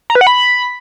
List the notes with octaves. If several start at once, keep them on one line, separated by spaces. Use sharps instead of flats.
A#5
B4
F#5
B5